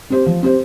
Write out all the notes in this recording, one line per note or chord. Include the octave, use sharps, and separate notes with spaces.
C4 G4 C5
F3
C4 G4 C5